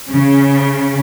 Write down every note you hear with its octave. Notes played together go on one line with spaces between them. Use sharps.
C#3